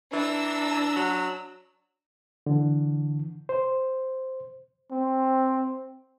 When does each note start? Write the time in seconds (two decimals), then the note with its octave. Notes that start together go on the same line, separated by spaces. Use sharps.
0.13 E3 D4 A#5 E6
0.96 F#3
2.46 D3 E3
3.49 C5
4.92 C4